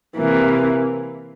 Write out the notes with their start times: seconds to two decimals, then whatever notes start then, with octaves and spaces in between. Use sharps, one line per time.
0.16 C3 E3 A#3